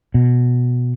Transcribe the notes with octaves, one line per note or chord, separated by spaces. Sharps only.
B2